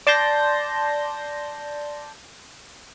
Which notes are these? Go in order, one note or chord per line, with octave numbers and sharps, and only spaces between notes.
D5 A5 C6 G6 A#6